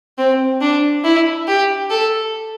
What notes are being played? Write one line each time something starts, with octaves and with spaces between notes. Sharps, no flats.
C4
D4
E4
G4
A4